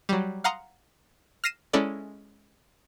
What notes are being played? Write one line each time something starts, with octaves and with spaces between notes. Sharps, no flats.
F#3 G3
F5 F#5 A#5 C6 D#6
F6 A#6 C7 D#7 E7
G#3 C#4 E4 A4 D5